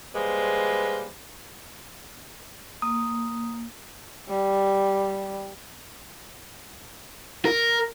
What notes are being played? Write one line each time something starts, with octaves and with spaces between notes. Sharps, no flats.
G3 G#3 A#3 B4 C5
A#3 D#6
G3
A#4